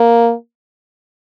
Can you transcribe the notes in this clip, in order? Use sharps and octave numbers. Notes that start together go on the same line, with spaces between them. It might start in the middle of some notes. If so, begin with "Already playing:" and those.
Already playing: A#3